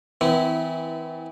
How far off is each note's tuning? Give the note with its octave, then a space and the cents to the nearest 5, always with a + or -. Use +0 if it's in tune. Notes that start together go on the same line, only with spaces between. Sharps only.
E3 -25 C4 -45 E4 -10